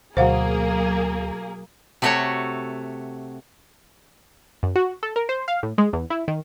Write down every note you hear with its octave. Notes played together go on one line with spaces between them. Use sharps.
D2 B2 F#3 A#3 G#4 C5 F5 F#5
C3 A3 F#4 A4 C#5 F#5
F#2
F#4
A4
A#4
C5
F5
A2
G#3
E2
E4
D#3